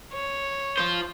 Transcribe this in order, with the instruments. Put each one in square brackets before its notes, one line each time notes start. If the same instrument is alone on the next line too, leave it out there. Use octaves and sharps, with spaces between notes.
[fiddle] C#5
[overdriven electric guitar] F4 C5